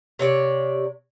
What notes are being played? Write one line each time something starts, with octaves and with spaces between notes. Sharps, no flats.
C3 C#5 D5